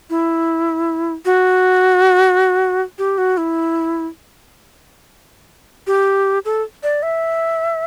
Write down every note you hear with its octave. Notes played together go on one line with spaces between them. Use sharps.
E4
F#4
G4
F#4
E4
G4
A4
D5
E5